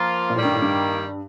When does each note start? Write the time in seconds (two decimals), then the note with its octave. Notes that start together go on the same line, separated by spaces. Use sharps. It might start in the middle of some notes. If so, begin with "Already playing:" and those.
Already playing: F3 A#3 F4
0.30 A#2
0.35 A2 D#3 G3 A#3
0.45 G2
0.53 A2
0.62 G2